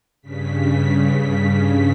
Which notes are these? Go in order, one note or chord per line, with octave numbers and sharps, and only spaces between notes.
G2 C#3 B6